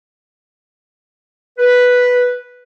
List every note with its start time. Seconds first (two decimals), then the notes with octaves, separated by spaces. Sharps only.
1.58 B4